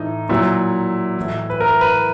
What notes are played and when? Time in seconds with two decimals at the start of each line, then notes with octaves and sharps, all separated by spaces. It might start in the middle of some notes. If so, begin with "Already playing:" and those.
Already playing: A2 E3 D#4
0.29 A#2 F#3 E4
1.17 A2 E3
1.50 B4
1.60 A#4
1.81 B4